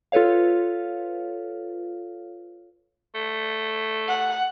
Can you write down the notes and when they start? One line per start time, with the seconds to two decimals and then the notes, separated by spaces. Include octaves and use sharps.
0.12 F4 A4 B4 C#5 F5
3.15 A3
4.08 F#5